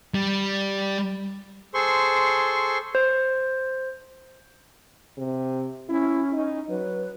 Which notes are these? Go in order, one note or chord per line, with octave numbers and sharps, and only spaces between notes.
G3
G#4 A4 C5 C6 C#6
C5
C3
C#4 E4
D#4
F#3 B4